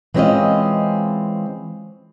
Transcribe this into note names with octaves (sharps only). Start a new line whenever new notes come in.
E3 G#3 C4 C#4 F4 D#5